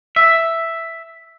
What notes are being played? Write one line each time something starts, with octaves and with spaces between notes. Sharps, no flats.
E5